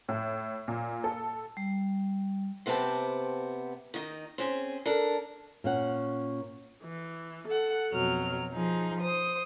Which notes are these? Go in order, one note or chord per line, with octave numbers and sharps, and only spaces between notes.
A2
A#2
A4
G3
C3 B3 C4 G4 A5
D#3 D#4
C4 C#4 G#4
D4 A4 A#4
A#2 C#4 F#5
E3
A4 F#5
F2 B2 F#3 F6
F3 D#4 G#4
C5 D#6